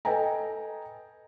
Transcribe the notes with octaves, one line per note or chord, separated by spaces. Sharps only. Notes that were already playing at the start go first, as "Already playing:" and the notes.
A4 B4 D#5 G5 G#5 A#5